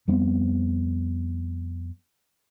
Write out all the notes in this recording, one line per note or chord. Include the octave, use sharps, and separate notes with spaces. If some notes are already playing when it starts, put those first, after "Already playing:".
F2 G3 B3 C4